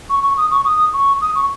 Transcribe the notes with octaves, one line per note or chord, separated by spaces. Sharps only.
C#6
C#6
D#6
C#6
D#6
C#6
D#6
C#6